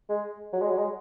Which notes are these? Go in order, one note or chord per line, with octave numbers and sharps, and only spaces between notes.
G#3
F#3
G#3
F#3
G#3